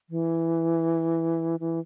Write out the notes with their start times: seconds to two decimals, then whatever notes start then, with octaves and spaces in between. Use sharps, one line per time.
0.10 E3
1.60 E3